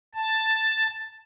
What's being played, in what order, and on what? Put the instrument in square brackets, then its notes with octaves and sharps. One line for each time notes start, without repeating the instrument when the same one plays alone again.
[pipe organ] A5